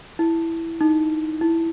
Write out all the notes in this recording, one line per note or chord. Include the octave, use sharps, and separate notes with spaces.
E4
D#4
E4